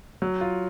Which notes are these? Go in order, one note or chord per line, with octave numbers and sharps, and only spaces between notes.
F#3
F4